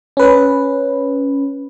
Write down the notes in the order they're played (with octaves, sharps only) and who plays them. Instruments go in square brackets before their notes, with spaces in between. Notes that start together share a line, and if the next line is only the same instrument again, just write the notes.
[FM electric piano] C#4 B4